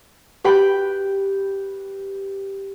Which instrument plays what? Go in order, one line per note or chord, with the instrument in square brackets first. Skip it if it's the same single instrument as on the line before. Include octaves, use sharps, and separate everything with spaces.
[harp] G4 B4 G5 B5